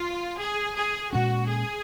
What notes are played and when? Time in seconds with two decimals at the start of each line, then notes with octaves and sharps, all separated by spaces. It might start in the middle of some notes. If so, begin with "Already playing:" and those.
Already playing: F4
0.39 G#4
0.76 G#4
1.12 A#2 G#3 C#4 F#4
1.48 G#4